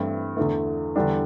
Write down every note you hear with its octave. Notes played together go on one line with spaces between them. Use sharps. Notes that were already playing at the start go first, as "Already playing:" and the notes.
Already playing: G2 E3 A3 C4 E4
E2 D3 A3
E2 D3 G3 D4